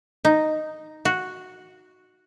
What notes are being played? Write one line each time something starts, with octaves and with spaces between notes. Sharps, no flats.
D#4
F#4